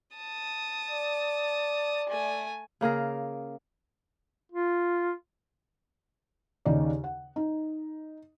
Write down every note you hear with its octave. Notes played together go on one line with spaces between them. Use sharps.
A5 D#6
D5
A3 G#5
C#3 A#3 G#4 A#4
F4
D#2 C#3 D#4 D5
F#5
D#4